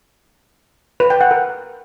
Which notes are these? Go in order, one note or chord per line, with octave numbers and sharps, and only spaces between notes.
B4
G5
F#5
A#4